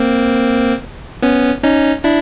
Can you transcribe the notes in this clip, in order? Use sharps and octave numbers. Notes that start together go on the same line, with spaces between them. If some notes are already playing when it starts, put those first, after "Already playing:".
Already playing: A#3 C4
B3 C#4
C#4 D#4
D4 E4